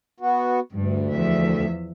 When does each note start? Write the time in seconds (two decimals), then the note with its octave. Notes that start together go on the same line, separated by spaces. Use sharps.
0.20 B3 F#4
0.72 D2 G2
1.11 E2 F3 E5